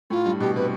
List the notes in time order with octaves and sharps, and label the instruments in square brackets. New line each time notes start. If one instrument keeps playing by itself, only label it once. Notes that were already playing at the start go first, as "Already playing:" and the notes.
[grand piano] A2 [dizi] F4
[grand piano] G2
[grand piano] B2 [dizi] G4
[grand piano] C3 [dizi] B4